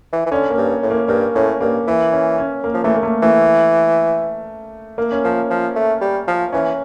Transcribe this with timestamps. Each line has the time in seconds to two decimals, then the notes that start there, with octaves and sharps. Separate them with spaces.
0.12 E3
0.26 E3
0.31 D3 C#4
0.50 A#3
0.57 G2
0.83 A2
0.90 A#3
1.08 G2 A#3
1.35 A2 C#4
1.61 G2 A#3
1.87 E3 A#3
2.12 C#4
2.38 C#4
2.64 A#3
2.74 F3
2.84 E3 A3
2.94 A#3
3.03 A3
3.22 E3 A3
4.98 A#3
5.12 C#4
5.24 F3 A#3
5.50 F3
5.75 A3
6.01 G3
6.28 F3
6.53 E3 C#4